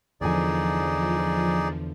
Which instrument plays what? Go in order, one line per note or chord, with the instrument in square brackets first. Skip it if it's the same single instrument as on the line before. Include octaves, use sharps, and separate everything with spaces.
[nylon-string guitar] E2 D3 G#5 [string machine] F3 [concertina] D#4 G#4 D5